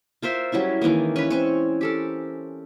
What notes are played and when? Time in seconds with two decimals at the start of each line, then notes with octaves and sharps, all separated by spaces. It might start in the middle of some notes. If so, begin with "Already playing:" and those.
0.22 F4 A#4 C5 E5
0.52 F#3 G3 C#4 E4
0.82 D#3 E3 G#3 A#3
1.16 C#4 B4
1.30 C4 C#4 C#5
1.81 G4 A4 A#4